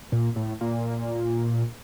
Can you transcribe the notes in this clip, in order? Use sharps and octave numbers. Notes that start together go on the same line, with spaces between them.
A#2
A2
A#2